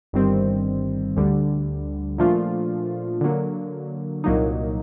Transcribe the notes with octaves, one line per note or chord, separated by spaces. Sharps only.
G1 G2 D#3 G3 C4
D2 D3 G3
A#2 F3 A3 D4 F4
D3 F#3 A#3
C2 A#2 F#3 A#3 D#4